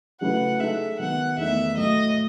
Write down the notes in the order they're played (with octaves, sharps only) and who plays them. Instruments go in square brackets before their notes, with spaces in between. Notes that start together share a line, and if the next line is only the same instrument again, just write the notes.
[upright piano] C#3 F#3 A3 E4 B4 [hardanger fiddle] F#5
[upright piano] G#3 D#4 A4 [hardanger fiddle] E5
[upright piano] D#3 F#3 B3 [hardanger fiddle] F#5
[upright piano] E2 D#3 A3 D#4 [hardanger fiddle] E5
[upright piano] A2 F#3 A3 [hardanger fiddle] D#5